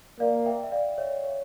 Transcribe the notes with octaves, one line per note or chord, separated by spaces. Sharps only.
A#3 D5 F5
E5 G5
E5
D5 F5
C#5 E5
C#5